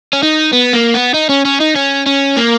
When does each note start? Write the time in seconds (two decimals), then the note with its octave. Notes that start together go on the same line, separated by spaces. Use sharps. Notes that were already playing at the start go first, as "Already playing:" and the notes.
0.13 C#4
0.23 D#4
0.53 B3
0.74 A#3
0.94 B3
1.14 D#4
1.29 C#4
1.45 C#4
1.61 D#4
1.76 C#4
2.07 C#4
2.36 A#3